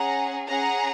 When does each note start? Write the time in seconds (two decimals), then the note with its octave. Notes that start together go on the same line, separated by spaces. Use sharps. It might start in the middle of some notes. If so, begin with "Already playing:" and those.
Already playing: C#4 G#4 F#5 A#5
0.48 C#4 G#4 F#5 A#5